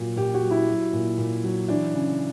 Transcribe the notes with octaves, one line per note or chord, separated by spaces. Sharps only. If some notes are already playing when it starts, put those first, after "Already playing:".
Already playing: A#2 F#3
A#2 G4
F#4
F#3
E4
F#3
A#2
A#2
F#3
E3 D4
C#3